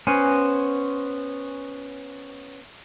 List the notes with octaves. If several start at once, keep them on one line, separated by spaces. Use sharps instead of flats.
B3 C#4 C5 G#5